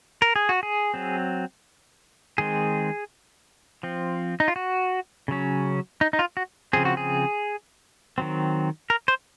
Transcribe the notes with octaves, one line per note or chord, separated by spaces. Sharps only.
A#4
G#4
F#4
G#4
F#3 C4
D#3 G#3 C4 G#4
F3 C4
D#4
F4
F#4
C#3 F#3 C#4
D#4
D#4
F4
F#4
C#3 F3 C4 G#4
F#4
G#4
D#3 F#3 C4
A#4
C5